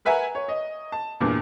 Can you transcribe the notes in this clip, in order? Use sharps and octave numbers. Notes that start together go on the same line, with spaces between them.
A#4 B4 E5 F#5 G#5 A#5
C#5
D#5
A5
E2 G2 A#2